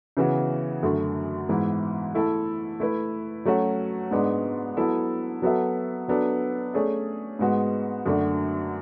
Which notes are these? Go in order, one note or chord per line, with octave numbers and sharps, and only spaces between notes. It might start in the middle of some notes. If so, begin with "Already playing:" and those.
C#3 E3 B3 F#4
F#2 D3 A3
G#2 E3 B3 E4
A3 E4 A4
A3 E4 B4
F#3 A3 C#4 F#4
G#2 G#3 B3 D4
F#3 B3 E4 A4
F#3 B3 F#4 A4 E5
F#3 B3 D4 A4
A3 C#4 G#4 D5
G#2 G#3 B3 F#4
F#2 D3 A3 D4 F#4